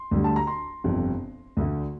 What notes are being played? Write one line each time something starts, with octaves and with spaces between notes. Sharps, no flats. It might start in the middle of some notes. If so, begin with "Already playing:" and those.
Already playing: C6
D2 D3 G3
A5
A#5
C6
G1 F2 C3
D2 D3 A3